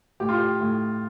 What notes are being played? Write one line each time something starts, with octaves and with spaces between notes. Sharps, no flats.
A2 G4
F4
G4
A2